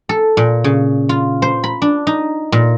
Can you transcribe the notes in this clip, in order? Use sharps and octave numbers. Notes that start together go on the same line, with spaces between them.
A4
A#2
C#3
F4
C5
B5
D4
D#4
A#2